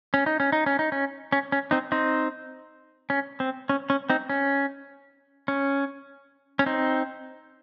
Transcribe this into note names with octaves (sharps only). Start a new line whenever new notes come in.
C#4
D#4
C#4
D#4
C#4
D#4
C#4
C#4
C#4
C4 D#4
C4 D#4
C#4
C4
C#4
C#4
C4 D#4
C#4
C#4
C#4
C4 D#4